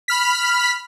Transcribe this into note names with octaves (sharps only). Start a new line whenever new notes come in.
B5 F6 B6